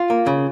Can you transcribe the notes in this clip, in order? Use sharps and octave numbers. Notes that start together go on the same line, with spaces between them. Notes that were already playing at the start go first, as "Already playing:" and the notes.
Already playing: F4
A#3
C#3